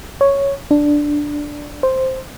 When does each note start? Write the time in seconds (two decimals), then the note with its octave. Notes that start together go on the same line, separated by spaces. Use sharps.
0.21 C#5
0.71 D4
1.83 C5